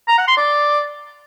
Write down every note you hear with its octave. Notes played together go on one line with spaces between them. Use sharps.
A#5
F#5
C6
D5